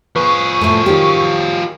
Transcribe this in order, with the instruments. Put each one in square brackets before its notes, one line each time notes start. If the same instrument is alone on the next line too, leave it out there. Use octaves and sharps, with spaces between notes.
[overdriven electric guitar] F3 G#4 [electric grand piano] B4 [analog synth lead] C#6
[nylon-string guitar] A2 A3
[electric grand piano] D#3 F#3 [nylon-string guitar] G4